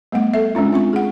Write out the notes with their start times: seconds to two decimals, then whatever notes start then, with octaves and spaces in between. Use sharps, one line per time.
0.12 G3 A3 B3 F#5
0.34 A4 E5
0.55 G#3 C#4 D4 F4
0.73 C4 F4 C#6
0.93 G#4 F#5